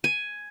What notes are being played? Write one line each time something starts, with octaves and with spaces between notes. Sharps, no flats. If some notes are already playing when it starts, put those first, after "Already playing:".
G#5